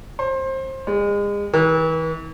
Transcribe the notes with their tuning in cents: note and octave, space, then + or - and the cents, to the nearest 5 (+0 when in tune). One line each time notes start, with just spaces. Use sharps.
C5 +25
G#3 -35
E3 -40